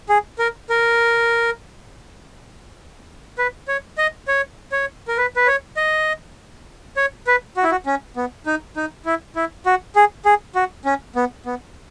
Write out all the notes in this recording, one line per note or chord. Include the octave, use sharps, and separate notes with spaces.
G#4
A#4
A#4
B4
C#5
D#5
C#5
C#5
A#4
B4
B4
C#5
D#5
C#5
B4
F#4
E4
F#4
C#4
B3
D#4
D#4
E4
E4
F#4
G#4
G#4
F#4
C#4
B3
B3